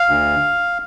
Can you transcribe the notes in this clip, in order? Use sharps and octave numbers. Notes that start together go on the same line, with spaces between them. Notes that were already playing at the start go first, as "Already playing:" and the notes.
Already playing: F5
D2